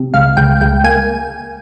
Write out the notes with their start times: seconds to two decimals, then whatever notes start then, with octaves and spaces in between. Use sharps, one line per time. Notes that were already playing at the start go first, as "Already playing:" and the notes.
Already playing: C3
0.14 C#2 F5
0.37 C#2 G5
0.61 C#2 G5
0.84 A#3 G#5